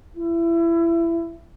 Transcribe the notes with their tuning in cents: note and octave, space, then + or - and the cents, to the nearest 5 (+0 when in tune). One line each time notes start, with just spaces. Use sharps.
E4 +25